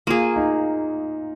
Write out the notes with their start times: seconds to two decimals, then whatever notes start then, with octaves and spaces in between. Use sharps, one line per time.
0.07 A#3 F4 G#4
0.36 D#4